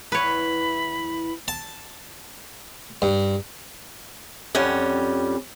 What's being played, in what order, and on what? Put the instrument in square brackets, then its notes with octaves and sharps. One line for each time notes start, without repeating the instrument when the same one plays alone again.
[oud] E2 E3 [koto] B4 C#5 [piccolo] B5
[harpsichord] A5
G2
[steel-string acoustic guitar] F2 G3 C#4 F#5